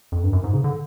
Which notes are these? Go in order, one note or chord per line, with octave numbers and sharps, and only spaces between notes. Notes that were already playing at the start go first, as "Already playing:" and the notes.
F2
G2
F#2
G#2
C#3
D3